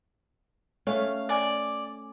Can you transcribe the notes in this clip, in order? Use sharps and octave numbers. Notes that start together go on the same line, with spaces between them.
A3 C#4 F5
D5 G#5